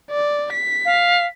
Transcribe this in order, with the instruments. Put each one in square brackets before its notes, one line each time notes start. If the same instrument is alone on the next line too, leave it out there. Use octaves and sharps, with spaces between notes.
[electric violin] D5
B6
[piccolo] F5